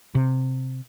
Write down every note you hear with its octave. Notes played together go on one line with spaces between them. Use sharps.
C3